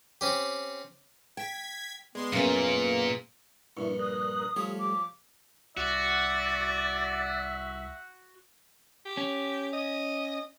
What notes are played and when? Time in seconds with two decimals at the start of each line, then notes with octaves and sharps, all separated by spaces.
0.21 C4 C#4 G4
1.37 G5 G#6 B6
2.15 G#3 B3 D5 C6
2.33 F#2 A#2 A#3 B3 C#4 G#4
3.77 A#1 G2 D4 E4 C#6
3.99 A#4 D#6 F#6
4.56 F3 G3 A3 G4 C#5
4.79 D6
5.77 C2 F#4 D5 E5
9.05 G4
9.17 C#4
9.73 D#5